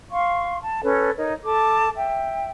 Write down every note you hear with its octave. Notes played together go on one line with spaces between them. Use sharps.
F5 C6 C#6
A5
C#4 A4 B4 C#5
D#4 A#4 C#5
A4 A5 D6
E5 G5